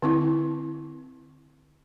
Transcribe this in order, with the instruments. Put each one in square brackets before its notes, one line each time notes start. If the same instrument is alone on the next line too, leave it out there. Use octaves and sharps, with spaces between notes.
[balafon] D3 C4 E4